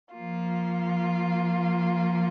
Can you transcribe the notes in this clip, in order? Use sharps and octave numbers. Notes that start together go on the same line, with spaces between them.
F3 A#3 F4